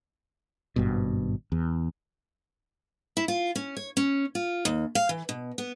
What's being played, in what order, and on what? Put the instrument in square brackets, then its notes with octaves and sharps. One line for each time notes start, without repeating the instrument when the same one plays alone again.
[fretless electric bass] G#1 G2 B2
E2
[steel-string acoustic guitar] E4
F4
C#4
C#5
C#4
F4
D#2
F5
E3
B2
B3